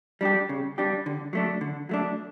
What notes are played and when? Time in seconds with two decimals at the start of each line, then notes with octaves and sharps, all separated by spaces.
0.21 G3 D4 G4
0.49 C#3
0.78 G3 D4 G4
1.06 D3
1.33 F#3 A3 D4
1.61 D3
1.89 F#3 A3 D4